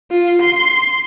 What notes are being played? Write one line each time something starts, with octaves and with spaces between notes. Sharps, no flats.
F4
C6